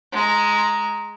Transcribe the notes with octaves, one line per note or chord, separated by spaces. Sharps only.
G#3 A#5